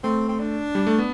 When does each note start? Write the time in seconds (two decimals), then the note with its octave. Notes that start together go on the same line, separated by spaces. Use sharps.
0.04 A3 C4
0.29 C4
0.39 D4
0.75 G3
0.87 A3
0.98 B3